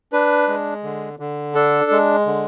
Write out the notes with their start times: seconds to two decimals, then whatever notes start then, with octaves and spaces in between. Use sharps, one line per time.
0.13 D4 B4
0.48 G#3
0.83 D3
1.19 D3
1.55 D4 A4
1.91 G#3
2.26 D3